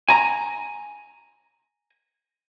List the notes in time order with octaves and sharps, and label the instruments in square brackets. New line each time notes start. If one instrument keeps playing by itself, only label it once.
[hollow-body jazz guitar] G#5 A#5